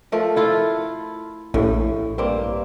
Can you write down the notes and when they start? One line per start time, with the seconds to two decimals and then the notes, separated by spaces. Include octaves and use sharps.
0.12 F3 A3 A#4
0.36 E4 F4 A4
1.54 A#1 A2
2.18 G2 A#3 C4